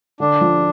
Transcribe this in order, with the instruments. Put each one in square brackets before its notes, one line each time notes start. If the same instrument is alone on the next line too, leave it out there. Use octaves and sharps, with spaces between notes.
[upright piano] D3 [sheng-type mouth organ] D4
[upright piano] F3